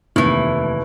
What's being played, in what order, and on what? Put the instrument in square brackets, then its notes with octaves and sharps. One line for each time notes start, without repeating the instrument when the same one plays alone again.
[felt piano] F1 D#2 [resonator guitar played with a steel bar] A2 E3